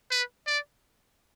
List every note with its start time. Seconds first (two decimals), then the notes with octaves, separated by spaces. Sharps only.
0.11 B4
0.47 D5